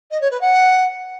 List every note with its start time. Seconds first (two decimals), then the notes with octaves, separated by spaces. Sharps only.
0.11 D#5
0.21 C#5
0.31 B4
0.41 F#5